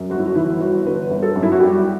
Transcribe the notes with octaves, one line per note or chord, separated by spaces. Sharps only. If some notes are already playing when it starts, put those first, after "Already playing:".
Already playing: F#2
G1 F#4
E4
F#4
E3 E4
G1 F#4
D3 B4
G1
A4
F#2
E4
F#4
G3 G4